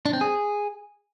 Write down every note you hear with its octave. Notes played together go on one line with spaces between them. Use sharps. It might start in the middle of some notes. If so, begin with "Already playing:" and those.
D4
C4
G#4